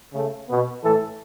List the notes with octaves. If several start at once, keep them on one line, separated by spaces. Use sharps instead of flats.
C#3 A3
B2 B3
A2 E3 A3 A4